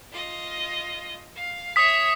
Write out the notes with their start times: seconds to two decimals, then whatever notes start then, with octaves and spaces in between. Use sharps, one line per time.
0.12 F4 D#5
1.36 F5
1.76 C#5 E5 D#6 B6